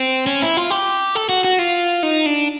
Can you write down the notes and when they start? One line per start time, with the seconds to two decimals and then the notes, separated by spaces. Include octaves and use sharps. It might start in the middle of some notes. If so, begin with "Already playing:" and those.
Already playing: C4
0.27 C#4
0.42 E4
0.57 F4
0.70 G4
1.15 A4
1.29 F#4
1.44 F#4
1.59 F4
2.03 D#4
2.26 D4